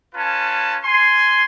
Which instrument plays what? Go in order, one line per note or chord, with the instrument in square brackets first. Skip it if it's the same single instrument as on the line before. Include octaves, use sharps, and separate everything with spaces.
[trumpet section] C#4 F4 B4 G#5 A5
G#5 C6